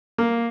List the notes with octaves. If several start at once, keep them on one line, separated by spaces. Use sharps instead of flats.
A#3